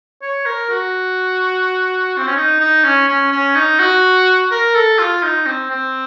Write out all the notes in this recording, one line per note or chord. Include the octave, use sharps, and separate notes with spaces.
C#5
A#4
F#4
C4
C#4
D#4
D#4
C#4
C#4
C#4
D#4
F#4
A#4
A4
F4
D#4
C4
C4